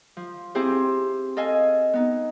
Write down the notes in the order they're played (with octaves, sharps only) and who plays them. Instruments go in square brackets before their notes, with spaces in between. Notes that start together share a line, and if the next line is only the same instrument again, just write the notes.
[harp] F3
C4 E4 G4 G#4 C5
A4 D#5 F5 G#5
B3 D#4